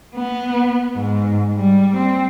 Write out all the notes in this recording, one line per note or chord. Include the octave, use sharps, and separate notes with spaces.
B3
G#2
G3
C4